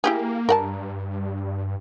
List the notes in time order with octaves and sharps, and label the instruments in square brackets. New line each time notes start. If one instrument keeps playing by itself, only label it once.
[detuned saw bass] A#3 [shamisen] E4 G4 G#4
[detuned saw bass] G2 [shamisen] A#4 F#5 A5